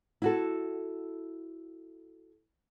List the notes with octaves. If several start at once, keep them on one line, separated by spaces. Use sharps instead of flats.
E4 F#4 A4